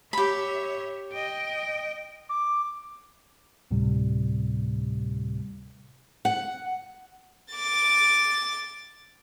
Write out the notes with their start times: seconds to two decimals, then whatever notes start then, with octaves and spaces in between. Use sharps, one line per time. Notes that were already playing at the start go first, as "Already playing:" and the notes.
0.13 G4 C#5 E5 B5
1.13 D#5 G5
2.29 D6
3.71 D2 A2 C3 G3
6.25 F#5
7.54 D6 A6